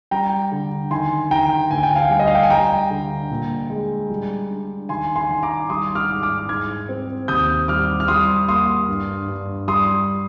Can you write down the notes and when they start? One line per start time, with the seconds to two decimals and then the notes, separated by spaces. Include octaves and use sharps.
0.11 G3 G5 A#5
0.52 D3
0.91 D#3 G#5 C6
1.30 D#3 G5 A#5
1.71 D2 G#5
1.83 G5
1.95 F5 G#5
2.10 G3
2.19 D#5
2.27 F5
2.35 G5
2.43 G#5
2.50 G3 G5 A#5
2.90 D3
3.30 A#2
3.70 G#3
4.10 G3
4.50 D4
4.89 D#3 G#5 C6
5.16 G#5 C6
5.30 D#3
5.43 A#5 D6
5.70 G3 C6 D#6
5.95 D6 F6
6.10 G#2
6.23 D6 F6
6.49 G#2 F6 G#6
6.89 C4
7.28 D#2 D#6 G6
7.68 G3 D6 F6
8.00 F6
8.08 G3 C6 D#6
8.48 A#3 C6 D#6
8.88 G2
9.28 G2
9.68 G3 C6 D#6